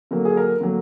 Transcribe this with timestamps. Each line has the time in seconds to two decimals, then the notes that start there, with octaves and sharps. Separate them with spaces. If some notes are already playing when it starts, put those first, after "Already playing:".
0.11 D3 F#3 A#3 A#4
0.25 G#4
0.37 A#4
0.61 D3 F#3 A#3